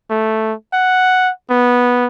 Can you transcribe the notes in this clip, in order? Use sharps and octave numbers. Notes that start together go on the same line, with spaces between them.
A3
F#5
B3